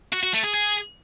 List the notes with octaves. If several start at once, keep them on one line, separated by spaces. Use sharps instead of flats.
F#4
F#4
A3
G#4
G#4